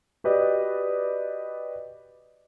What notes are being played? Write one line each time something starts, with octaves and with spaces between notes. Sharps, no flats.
F#4 G4 B4 D5 D#5